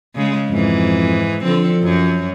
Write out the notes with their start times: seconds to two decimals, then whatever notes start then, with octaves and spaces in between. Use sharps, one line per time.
0.15 C#3 G#3
0.50 F2 G#2 E3
1.43 D3 F3 C4 A4
1.83 F#2 F#3